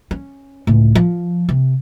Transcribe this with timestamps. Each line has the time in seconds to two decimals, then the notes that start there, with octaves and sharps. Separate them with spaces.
0.11 C#4
0.67 C#2 A2
0.95 F3
1.49 C3